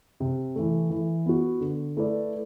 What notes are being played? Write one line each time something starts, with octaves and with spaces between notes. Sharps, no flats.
C3
E3 A3
E3
B3 F#4
D3
A3 E4 B4 D5